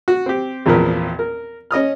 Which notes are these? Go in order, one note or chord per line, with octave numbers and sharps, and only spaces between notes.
F#4
C4 G4
G#1 E2 A#2 F3 B3 A#4
A#4
C#4 D#5 D#6 F6